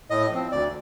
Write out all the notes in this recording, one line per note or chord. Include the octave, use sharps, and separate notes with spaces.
A2 D#5
F3 C4
D2 D5